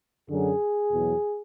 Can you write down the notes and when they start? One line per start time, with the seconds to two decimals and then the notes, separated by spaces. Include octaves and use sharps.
0.28 F#2 D3 F#3 G#4
0.90 E2 B2 F#3